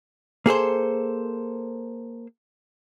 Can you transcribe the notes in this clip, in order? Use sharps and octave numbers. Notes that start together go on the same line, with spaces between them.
A#3 G#4 A4 C5